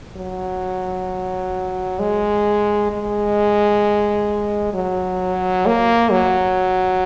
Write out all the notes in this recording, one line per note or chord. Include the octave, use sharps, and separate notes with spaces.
F#3
G#3
G#3
F#3
A#3
F#3